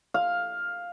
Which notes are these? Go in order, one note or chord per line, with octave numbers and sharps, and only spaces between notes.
F5